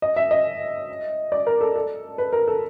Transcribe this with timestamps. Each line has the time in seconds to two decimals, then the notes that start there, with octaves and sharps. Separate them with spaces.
0.02 D#5
0.16 E5
0.31 D#5
1.32 D5
1.47 A#4
1.61 A4
1.76 A4
2.18 B4
2.33 A#4
2.48 A4